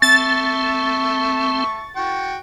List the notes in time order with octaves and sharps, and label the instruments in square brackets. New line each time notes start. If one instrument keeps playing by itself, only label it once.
[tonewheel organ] C4 [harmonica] E5 A5 C#6 [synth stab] A6
[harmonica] F#4 G5 C#6